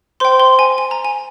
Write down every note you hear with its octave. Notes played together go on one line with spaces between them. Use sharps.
C5 G5 C6
C6
G#5
G#5
A#5
G#5